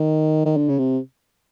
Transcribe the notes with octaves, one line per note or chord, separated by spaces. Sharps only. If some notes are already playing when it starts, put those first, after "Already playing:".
Already playing: D#3
D#3
D3
C#3
C3